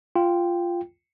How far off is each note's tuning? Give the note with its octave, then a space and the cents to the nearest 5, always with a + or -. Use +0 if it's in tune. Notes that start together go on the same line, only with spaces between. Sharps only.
F4 -5 G5 +0